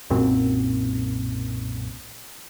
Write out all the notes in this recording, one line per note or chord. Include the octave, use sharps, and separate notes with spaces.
B1 F#2 A#2 C4